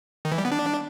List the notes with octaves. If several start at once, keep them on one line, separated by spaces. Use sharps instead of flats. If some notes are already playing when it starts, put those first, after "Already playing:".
D#3
E3
G3
B3
D4